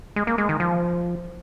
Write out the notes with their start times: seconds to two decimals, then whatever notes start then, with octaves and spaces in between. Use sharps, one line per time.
0.16 G#3
0.27 A#3
0.38 G#3
0.49 D#3
0.60 F3